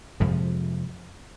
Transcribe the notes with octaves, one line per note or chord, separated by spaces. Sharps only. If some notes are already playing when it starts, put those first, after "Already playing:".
F2 C3 F3 G#3